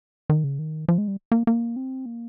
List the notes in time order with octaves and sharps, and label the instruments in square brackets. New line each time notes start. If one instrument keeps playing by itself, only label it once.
[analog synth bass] D#3
C#3
D#3
F3
G#3
G3
A#3
A#3
C4
A#3